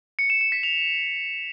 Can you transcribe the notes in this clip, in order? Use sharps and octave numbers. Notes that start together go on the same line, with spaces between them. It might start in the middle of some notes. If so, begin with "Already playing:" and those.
C#7
E7
E7
B6
F7